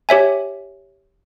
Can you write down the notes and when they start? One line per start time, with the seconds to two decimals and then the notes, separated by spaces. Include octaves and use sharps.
0.09 G4 C#5 E5 G#5